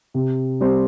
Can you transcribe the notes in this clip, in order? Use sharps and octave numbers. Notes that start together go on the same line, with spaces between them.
C3
G3 C4 G4 C5